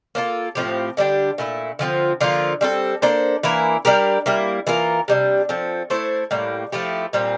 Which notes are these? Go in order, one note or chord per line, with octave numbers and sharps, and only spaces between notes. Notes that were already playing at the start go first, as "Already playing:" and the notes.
A#3 D4 F4 A4
A2 F3 C4 G4
D3 G3 D4 G4
A#2 A3 E4
D3 F3 C4 F4
D3 F3 A#3 F4
G3 C4 F4 A4
A#3 D4 A4 C5
E3 A#3 E4 A#4
G3 D4 G4 A#4
G3 A#3 E4
E3 A#3 F4 A#4
C3 G3 D4
F3 A3 C4
A3 E4 A4 C5
A2 G3 A#3
F3 A3 E4 G4
A#2 G3 C4